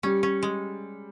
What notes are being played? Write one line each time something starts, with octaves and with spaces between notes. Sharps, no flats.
G3 C#4
C#4
G#3